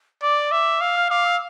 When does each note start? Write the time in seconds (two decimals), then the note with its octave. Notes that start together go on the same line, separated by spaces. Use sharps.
0.22 D5 D6
0.52 E5
0.81 F5 E6
0.96 F6
1.10 F5 D6
1.25 E6